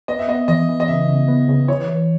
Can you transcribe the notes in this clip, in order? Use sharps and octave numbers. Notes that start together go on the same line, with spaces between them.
B3 D#5
E5
B3 D#5
E3 D#5
E3
D#5
C#3 E5
C#3
B3
C#3
E3 C#5
E3